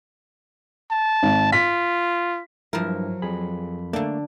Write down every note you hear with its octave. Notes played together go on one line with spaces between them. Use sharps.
A5
G#1
F4 B6
G2 F3 F#3 E4 A#4
F2 G#4 B5
D3 A3 A#3 D4